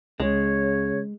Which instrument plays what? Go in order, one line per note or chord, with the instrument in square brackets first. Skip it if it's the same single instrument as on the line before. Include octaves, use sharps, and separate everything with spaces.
[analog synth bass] C#2 [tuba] C#3 [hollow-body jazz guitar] G#3 [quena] C#5